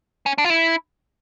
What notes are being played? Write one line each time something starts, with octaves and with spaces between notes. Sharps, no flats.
C#4
D4
F4
E4